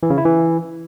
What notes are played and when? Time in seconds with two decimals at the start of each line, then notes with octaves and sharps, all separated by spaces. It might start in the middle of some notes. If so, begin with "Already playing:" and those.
0.03 E3
0.10 C#3
0.18 E4
0.25 E3